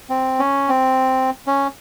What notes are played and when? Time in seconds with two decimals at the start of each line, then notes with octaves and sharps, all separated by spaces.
0.10 C4
0.39 C#4
0.69 C4
1.47 C#4